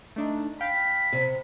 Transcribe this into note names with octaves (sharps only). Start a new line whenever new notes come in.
A3 D4 D#4
F5 G5 B5
C3